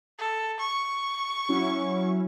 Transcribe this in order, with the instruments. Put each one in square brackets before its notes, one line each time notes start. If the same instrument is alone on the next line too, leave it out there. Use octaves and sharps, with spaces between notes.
[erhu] A4
C#6
[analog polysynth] F#3 C#4 E4